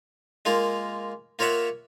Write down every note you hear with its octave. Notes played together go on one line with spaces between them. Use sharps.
G#3 A#3 F4 A#4
A#3 F4 A#4 C#5 E5 F#5